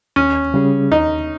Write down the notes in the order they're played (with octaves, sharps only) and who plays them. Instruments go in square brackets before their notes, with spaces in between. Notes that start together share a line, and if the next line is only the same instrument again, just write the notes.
[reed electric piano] D#2 [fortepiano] C#4
[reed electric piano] C#3 G3 C#4 G#4
[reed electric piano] D#2 [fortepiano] D#4